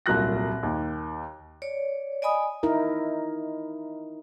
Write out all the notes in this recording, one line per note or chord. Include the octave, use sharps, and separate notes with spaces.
D#1 C2 A#2 F#3 F#6 A#6
D#2
C#5 D5
D5 D#5 G#5 B5 D#6
D#4 E4 A#4